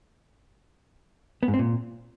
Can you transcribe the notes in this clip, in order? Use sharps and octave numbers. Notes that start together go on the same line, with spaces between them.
B3
G#2
C4
A#2